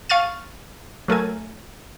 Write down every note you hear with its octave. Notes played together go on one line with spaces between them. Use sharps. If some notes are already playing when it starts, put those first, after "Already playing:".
F5 C#6 F6 A6 D#7
F#3 A3 A#4 G#5